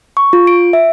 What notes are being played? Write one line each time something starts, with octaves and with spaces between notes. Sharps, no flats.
C#6
F4
D7
E5